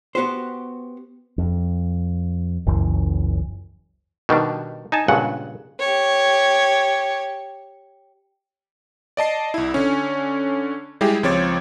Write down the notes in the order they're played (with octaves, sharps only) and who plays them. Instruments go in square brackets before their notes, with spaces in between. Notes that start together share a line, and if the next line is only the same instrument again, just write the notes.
[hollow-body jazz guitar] B3 F#4 G4 C5
[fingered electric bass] F2
F#1 C#2 F#2 E3
[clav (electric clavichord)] B2 D#3 G3 D4
D#4 G#5 A5
G2 A#2 C#3 G#3 F#5
[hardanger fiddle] G4 C#5
[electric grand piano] D5 D#5 A5 C7
C2 E4
D3 C#4
G3 G#3 E4 G4 G#4
C#2 F3 C4 C#5 D6 A6